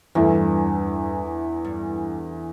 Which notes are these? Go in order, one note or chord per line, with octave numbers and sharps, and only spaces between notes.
E2 G2 E3 A3 E4
G2